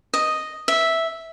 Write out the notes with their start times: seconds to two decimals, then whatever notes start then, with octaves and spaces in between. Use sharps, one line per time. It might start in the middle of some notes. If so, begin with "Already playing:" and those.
0.14 D#5
0.68 E5